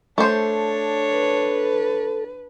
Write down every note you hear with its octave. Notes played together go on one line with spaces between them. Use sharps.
A3 D4 A4 C5 C#5
B4